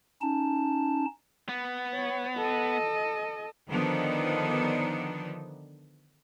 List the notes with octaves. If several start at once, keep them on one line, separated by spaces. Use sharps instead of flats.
C#4 D#4 A5
B3
C#5
A4 D#5
D3 D#3 F3 B3 D4 D#4